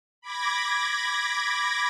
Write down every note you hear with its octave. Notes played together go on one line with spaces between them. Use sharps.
B5 D6 G#6 A#6